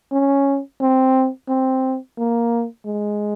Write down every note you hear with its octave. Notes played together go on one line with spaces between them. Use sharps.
C#4
C4
C4
A#3
G#3